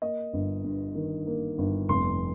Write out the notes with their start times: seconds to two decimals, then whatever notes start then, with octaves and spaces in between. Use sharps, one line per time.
0.02 A#3 D#5
0.33 G1
0.64 G2
0.95 D#3
1.27 A#3
1.58 G1
1.89 F1 C6